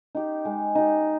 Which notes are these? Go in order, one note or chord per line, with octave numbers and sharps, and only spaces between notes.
D#4 G4
G#3
D#4 G4